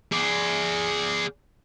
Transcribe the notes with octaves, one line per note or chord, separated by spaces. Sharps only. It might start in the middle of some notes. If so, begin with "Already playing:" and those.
G#4 D5